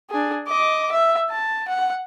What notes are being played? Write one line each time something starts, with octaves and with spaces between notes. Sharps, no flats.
D4 G#4
D#5 D6
E5
A5
F#5